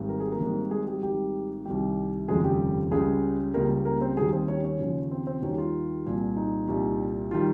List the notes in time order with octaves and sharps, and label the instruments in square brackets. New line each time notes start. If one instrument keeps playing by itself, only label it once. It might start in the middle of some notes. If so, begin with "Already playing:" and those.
Already playing: [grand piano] G#1 G#2 D#3 G3
A#4
G#4
A#3 A#4
G#1 G#2 D#3 G3
G#3 G#4
G3 G4
G#1 G#2 D#3 G3 G4
C2 C3 D#3 G3 G4
F1 D#2 C#3 F3 G#3 G#4
G3 G4
C#2 C#3 G3 G#3 G#4
C#2 C#3 G3 A#3 A#4
A#3 A#4
C4 C5
D#2 D#3 G3 G#3 G#4
C4 C5
C#4 C#5
C#4 C#5
D#2 C#3 F3
C4 C5
C4 C5
D#2 D#3 G3 C#4 C#5
G4
F4
C2 A#2 G3
D#4
C2 A#2 G3
D#3 G3 F4